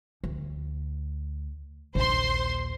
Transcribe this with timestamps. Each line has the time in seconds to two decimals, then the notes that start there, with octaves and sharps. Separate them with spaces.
0.24 D2
1.95 A#1 D#2 C5 C6